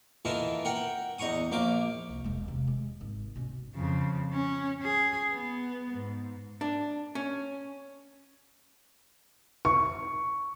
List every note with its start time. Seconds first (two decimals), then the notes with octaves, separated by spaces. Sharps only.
0.25 D#3 E3 F4 A4 A#4
0.65 A#4 F#5 G5
1.18 E2 D#5 A#5 C#6 D#6
1.52 A#1 A#3 F5 D6
2.09 C2
2.24 E1 G#3
2.48 C3 D#3
2.67 G#3
3.01 G#1
3.36 B2 C#4
3.75 F2 C#3
4.33 C#4
4.82 G#4
5.32 B3
5.93 G#2
6.61 D4
7.15 C#4
9.65 C#6